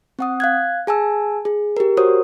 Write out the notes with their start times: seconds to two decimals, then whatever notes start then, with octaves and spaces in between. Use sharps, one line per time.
0.19 C4 F#5 D#6
0.40 F5 F#6 G#6
0.87 G#4 G#5 A5 E6
1.45 G#4
1.77 G4 A#4
1.97 F#4 A#4 C5 C#5 D#6